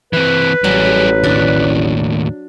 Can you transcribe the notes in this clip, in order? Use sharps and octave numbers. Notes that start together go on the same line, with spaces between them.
E3 C4 B4
A1 F#3 G3 G#4
D#2 A2 D4